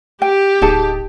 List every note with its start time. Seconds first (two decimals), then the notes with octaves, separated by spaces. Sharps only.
0.22 G4 G5
0.62 D1 D#4 G#4 A5